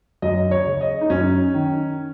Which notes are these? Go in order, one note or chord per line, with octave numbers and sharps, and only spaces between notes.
F#2 D#5
C#5
C#3
D#5
D#4
F#2 C#4
D#3